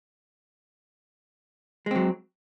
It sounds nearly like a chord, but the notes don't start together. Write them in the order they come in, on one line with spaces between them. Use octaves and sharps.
G#3 C4 F#3